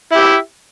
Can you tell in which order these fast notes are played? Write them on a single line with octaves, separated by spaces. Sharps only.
E4 G4 E5